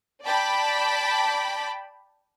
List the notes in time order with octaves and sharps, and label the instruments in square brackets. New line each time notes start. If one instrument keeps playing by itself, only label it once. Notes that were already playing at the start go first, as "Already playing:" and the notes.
[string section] D5 G5 A5 B5 D6